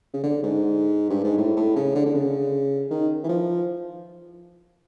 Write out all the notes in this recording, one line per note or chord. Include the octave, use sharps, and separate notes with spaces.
C#3
D3
G#2
G2
G#2
A2
A2
C#3
D3
D3
C#3
D#3
E3
F3